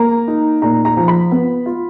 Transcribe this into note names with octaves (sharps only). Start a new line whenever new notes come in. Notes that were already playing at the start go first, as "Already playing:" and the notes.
Already playing: A#3 A#5
D#4
A#2 A#5
A#5
F3
B5
B3
F4